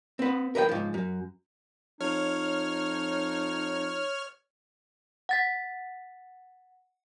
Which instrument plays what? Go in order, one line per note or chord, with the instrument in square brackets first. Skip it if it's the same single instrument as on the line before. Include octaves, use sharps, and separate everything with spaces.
[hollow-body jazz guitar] C4 B4
A#4 B4 D#5 G5
G#2 F3
F#2
[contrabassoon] F2 [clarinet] D#4 [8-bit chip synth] C#5 F6
[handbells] F#5 A6 B6